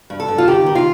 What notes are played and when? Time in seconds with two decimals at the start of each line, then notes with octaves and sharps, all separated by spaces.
0.10 G2
0.20 A4
0.28 G2
0.38 F4
0.47 D#3 G4
0.66 D#3
0.75 F4